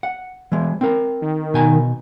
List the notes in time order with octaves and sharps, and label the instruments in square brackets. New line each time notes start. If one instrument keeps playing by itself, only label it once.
[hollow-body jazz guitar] F#5
E3 G#3
C4 A#4
[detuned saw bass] D#3
[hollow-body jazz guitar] B2 G#5 A#5